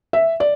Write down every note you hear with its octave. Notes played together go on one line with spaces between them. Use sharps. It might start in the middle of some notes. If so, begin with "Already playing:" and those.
E5
D5